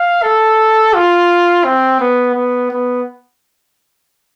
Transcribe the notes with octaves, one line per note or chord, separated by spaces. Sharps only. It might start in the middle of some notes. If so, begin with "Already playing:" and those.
Already playing: F5
A4
F4
C4
B3
B3
B3